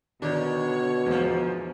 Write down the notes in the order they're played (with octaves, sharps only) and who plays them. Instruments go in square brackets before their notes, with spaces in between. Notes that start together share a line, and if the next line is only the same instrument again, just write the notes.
[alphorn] B2 [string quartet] D3 C#5 [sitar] D#3 [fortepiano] D4
[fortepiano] E2 [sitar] G#2 F3